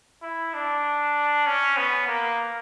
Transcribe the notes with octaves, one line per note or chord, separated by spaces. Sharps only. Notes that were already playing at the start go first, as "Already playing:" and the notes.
E4
D4
C#4
B3
A#3